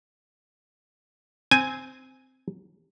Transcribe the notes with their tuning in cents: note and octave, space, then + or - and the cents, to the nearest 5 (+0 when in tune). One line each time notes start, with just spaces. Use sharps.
C4 -10 G#5 +0